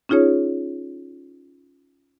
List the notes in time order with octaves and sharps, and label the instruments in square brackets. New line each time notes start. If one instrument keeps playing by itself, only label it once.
[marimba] C#4 D#4 F4 G#4 C#5